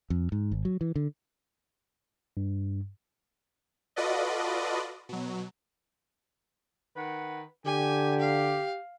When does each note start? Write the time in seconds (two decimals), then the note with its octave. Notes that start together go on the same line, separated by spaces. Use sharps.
0.10 F2
0.32 G#2
0.52 G#1
0.65 F#3
0.81 E3
0.96 D3
2.37 G2
3.96 F4 F#4 A4 B4 D5 D#5
5.09 B2 F#3
6.95 D#3 B4 F#5
7.66 D3 G4 G#5
8.20 F5